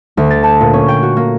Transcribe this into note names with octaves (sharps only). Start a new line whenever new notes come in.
D2
A6
A5
A#2
C#4
G5
F#4
A#3